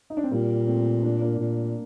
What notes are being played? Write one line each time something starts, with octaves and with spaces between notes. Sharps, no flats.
D#4
D4
C4
A#2 G3 A#3
A3 C4
A#3 D4
A#3 D4
A#2